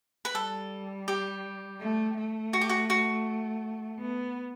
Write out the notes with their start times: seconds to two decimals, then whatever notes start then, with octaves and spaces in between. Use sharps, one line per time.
0.25 B4
0.35 G3 A4
1.08 G4
1.80 A3
2.17 A3
2.53 F#4
2.61 G4
2.69 F#4
2.90 F#4
4.00 B3